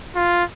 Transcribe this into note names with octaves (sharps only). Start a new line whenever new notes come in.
F4